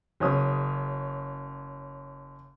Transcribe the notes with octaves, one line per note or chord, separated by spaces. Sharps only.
F#1 C#4 D#6